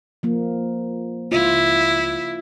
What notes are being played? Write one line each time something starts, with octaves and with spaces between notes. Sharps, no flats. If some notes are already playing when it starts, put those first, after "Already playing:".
F3 A#3
C#2 E4 F4